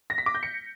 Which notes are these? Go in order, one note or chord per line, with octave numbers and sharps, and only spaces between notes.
A#6
B6
D6
G6
C#7